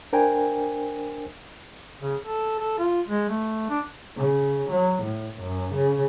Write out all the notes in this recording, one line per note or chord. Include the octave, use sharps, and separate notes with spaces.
D4 A#4 C5 G5 G#5
C#3
A4
A4
F4
G#3
A3
D4
C#3
F#3
A2
F#2
C#3